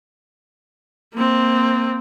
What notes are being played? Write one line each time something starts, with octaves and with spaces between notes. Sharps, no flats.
A#3 C4